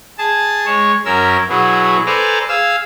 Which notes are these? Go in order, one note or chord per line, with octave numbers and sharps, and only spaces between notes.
G#4 A5
G#3 C#5
F#2 C#4 A#4 E6
B2 F#3 B3 E4 G#4
A4 B4 C5 D5 G#5 A#5
G#4 F5 E6